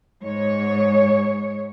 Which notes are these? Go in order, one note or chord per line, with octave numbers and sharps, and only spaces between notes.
G#2 C#5